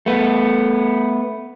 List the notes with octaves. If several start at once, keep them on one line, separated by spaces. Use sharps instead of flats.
A3 B3